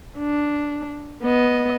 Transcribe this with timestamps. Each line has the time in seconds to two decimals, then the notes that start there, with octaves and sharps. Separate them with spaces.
0.18 D4
1.23 B3 D#5